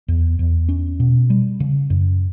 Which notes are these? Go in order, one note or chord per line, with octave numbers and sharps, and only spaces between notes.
E2
E2
C#4
B2
G3
C#3
F#2